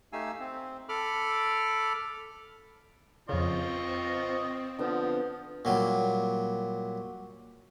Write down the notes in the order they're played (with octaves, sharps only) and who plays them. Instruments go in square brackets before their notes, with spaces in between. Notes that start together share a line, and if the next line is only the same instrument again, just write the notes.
[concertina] A3 D#4 G4 F5 G#5 E6
C4
A4 B5 D6 F6
[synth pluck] F2 C#3 [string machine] C4 [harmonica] F4 D#5 C#6
[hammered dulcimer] D3 B3 [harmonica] F3
[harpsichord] A#2 F#3 G3